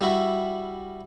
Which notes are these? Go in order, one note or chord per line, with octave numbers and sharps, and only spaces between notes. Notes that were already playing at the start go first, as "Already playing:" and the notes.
G3 E4 F#4 E5